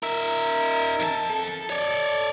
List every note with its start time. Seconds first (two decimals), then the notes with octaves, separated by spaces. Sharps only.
0.03 D#4 A#4 E5
1.00 F2 A5
1.30 A4
1.70 C#5 D5